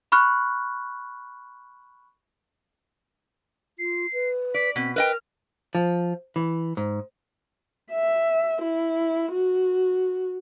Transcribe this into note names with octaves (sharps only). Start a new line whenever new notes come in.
B5 C#6 F6 F#6
F4 C7
B4
D5 B6
B2 C4 B6
A#4 B4 D#5 G5 F6
F3
E3
G#2
E5
E4
F#4